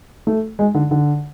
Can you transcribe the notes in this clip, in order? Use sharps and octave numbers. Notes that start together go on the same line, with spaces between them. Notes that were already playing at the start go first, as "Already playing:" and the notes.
A3
G#3
D3
D3